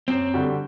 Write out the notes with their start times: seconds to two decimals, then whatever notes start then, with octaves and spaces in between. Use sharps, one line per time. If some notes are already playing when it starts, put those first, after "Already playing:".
0.08 F#2 C4
0.34 D3 G3 D4 F#4